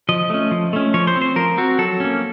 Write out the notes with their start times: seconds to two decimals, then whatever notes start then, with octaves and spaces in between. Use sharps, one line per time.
0.09 F3 D#5
0.30 A3 C#4
0.51 F3
0.73 A3 C#4
0.94 F3 C#5
1.07 C5
1.16 C4
1.22 C5
1.36 F3 A#4
1.58 C4 F#4
1.78 F#3 A4
2.00 A#3 C#4